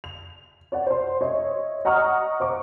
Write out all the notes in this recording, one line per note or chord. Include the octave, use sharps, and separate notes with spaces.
F7
C#5 D5 F#5
C5 C6
C#5 D#5 E5
D#5 F#5 A#5 C#6 D#6 F6
C5 C#6 D6